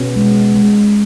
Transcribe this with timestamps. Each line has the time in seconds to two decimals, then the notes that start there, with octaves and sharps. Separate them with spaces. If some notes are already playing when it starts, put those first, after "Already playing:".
Already playing: B2 C#4 G#4
0.16 G#3
0.55 G#3